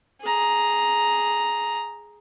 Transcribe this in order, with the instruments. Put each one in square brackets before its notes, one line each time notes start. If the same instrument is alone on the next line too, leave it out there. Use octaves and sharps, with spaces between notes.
[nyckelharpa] G#4 A#5